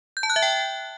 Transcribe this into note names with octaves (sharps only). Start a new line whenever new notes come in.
G6
A5
F#6
E5
G5